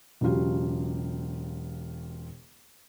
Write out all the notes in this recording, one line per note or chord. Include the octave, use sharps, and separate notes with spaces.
E1 C#3 F#3 F4 G4